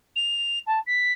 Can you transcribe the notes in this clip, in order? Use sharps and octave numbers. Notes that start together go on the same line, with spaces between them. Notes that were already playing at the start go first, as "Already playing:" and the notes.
F7
A5
B6